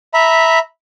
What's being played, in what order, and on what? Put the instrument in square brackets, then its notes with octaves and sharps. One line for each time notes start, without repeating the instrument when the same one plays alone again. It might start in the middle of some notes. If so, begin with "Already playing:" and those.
[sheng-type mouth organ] E5 A#5 B5